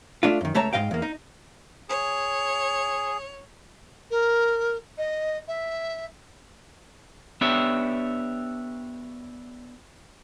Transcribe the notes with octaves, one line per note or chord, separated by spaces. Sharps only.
A3 D4 F4
F#2 D#3
C#2 A3 C#5 A5 A#5
G#2 B2 D#5 F5 G5
E2 A#3
D#4
G#4 C#5
A#4
D#5
E5
B3 D4 G4 C#5 E5